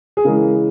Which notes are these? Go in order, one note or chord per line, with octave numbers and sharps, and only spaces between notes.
G#4
C#3 E3 G#3 A#4